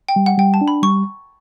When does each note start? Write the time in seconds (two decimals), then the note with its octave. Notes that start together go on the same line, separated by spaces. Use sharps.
0.09 G5
0.16 G3
0.26 F#5
0.38 G3 G5
0.54 A5
0.61 D4
0.68 B5
0.83 G3 C#6